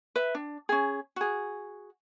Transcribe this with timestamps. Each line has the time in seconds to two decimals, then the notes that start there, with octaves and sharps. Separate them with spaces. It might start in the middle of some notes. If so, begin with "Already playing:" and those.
0.16 B4 E5
0.35 D4
0.69 C#4 G#4
1.16 F#4 G#4